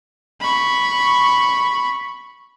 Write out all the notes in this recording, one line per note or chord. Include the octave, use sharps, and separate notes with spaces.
B5 C#6